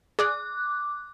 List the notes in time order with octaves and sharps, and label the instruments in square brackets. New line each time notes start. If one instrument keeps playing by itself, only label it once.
[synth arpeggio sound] G#4 D5 D#6 [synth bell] D6 F#6